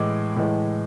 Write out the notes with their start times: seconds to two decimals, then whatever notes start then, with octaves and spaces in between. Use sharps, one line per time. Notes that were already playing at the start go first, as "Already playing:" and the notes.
Already playing: A2 E3 G#3 D6
0.36 A2 E3 G#3